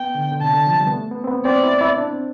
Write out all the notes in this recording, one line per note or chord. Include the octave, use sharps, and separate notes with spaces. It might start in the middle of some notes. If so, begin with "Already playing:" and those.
Already playing: B3 G5
D3
D3
C3 A5
D3
F3
G3
B3
A3
B3
C4
B3
C4 D5
E4
E4
D4
C4